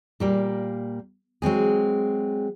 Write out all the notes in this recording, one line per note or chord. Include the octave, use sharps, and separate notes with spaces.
A#2 G3 A#3
F#3 G#3 C4 G#4